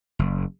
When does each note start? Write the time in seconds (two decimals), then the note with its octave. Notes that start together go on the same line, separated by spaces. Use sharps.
0.19 F#1